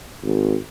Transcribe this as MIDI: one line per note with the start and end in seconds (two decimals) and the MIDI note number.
0.23 0.56 32